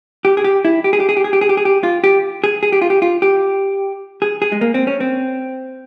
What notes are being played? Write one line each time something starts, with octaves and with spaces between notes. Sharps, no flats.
G4
G#4
G4
E4
G4
G#4
G4
G#4
G4
G#4
G4
G#4
G4
G#4
G4
F4
G4
G#4
G#4
G4
F4
G4
F4
G4
G#4
G#4
G#3
A#3
C4
C#4
C4